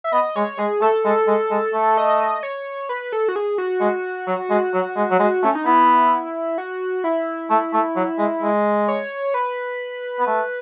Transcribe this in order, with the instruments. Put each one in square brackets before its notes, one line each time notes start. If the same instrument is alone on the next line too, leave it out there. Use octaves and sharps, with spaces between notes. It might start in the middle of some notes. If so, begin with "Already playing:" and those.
[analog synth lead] E5
[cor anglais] B3 [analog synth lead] D#5
[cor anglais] G#3 [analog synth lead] C#5
[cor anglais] G#3 [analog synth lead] G#4
[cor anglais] A3 [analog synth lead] A4
[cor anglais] G#3
G#3
G#3
A3
[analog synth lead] D#5
C#5
B4
A4
F#4
G#4
F#4
[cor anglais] G#3
F#3
G#3
F#3
G#3
F#3
G#3
[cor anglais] A3 [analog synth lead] C#4
[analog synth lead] D#4
[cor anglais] B3 [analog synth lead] E4
[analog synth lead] F#4
E4
[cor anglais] A3
A3
F#3
G#3
G#3
[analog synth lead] C#5
B4
[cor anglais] B3
A3